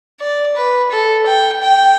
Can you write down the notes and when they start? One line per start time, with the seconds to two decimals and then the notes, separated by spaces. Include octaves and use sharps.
0.20 D5
0.56 B4
0.91 A4
1.26 G5
1.63 G5